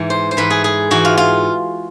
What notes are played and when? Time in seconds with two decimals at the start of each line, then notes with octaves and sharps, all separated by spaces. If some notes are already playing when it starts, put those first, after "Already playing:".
Already playing: G#2 E3
0.10 C5
0.31 C5
0.37 G#2 E3 B4
0.50 G#4
0.64 G#4
0.91 G#2 E3 F#4
1.05 F4
1.17 F4